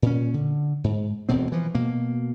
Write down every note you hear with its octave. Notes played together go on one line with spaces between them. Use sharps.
A#2 C#4
D3
G#2
E1 D2 B2 C4
E3 F3
B2 A#3